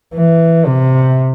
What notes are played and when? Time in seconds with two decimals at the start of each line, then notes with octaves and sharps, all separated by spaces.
0.14 E3
0.66 C3